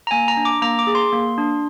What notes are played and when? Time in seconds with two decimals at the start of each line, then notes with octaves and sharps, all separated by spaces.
0.07 A#5
0.11 A#3 G#5
0.28 A#5
0.37 D4
0.45 D6
0.62 A#3 A#5
0.79 D6
0.87 G#4
0.95 C6
1.13 A#3
1.38 D4